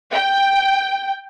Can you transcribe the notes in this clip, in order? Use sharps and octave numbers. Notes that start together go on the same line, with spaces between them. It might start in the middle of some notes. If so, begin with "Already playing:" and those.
G5